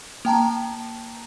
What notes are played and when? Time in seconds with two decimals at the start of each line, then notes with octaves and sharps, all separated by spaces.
0.25 A#3 G5 A5 A#5